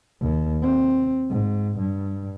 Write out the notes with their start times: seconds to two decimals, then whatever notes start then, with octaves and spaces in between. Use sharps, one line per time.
0.21 D#2
0.62 C4
1.30 G#2
1.78 G2